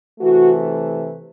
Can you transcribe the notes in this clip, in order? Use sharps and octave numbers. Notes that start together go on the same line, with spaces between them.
C3 E3 A3 F#4